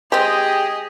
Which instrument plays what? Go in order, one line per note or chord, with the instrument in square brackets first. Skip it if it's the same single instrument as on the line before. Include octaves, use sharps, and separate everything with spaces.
[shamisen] G#3 C4 [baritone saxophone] G4 [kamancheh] G#4 D#5